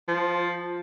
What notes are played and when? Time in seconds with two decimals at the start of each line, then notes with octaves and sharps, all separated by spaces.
0.08 F3